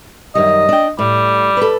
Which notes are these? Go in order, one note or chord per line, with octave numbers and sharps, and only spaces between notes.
F#2 D#3 G3 D#5
D4 G5
A2 G3
A4 B4